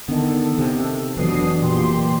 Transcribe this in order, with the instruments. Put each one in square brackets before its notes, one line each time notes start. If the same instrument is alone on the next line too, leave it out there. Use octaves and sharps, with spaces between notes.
[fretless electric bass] D3 D#3 [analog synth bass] B3 [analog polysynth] A4
[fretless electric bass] C3 D#3
[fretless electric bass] F1 B2 F#3 [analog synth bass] E3 [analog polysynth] D4 D#6 C7
[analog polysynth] A#2 G4 C6